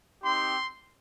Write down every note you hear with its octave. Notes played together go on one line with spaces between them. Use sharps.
C4 D#4 G4 C6